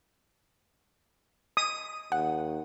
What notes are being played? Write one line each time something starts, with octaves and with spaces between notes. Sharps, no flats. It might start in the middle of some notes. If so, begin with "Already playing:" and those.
D#6
D#2 F#5